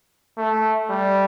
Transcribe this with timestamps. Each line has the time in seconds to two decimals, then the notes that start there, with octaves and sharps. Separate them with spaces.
0.38 A3
0.90 G3